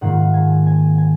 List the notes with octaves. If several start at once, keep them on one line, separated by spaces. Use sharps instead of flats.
G#2 D#3 A#3 F4 F#5
G#5
G#5
G#5